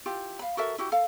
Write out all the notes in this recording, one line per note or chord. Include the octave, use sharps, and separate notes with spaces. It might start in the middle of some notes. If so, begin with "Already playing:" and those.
E4 F4 G4
F5 B5
F#4 A4 A#4 E5
E4 F#4 G4
A4 F5